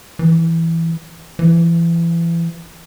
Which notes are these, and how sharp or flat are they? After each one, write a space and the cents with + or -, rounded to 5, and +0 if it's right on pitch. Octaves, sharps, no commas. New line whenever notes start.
E3 +0
E3 +30